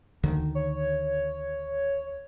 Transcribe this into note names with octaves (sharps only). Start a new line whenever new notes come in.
D2 D3 D#3
C#5